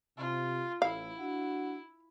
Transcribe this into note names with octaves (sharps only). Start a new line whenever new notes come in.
C3 F4
A1 A2 E4 F5
D4 F#4 F#5